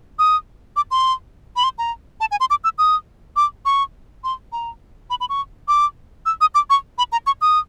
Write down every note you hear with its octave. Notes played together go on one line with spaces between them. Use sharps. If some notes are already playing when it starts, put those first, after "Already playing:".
D#6
D6
C6
B5
C6
A#5
A5
G#5
C6
D6
E6
D#6
D6
C#6
C6
A#5
B5
B5
C#6
D6
E6
D#6
D6
C#6
B5
A#5
C#6
D#6